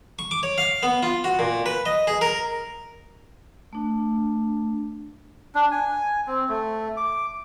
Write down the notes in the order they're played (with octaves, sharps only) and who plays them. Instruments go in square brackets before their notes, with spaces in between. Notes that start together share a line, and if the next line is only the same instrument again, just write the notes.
[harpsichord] C#6
D6
C#5
F5
B3
F4
F#4
A#2
B4
D#5
G#4
A#4
[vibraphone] A3 D4
[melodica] D4
G#5
C4
A3
D6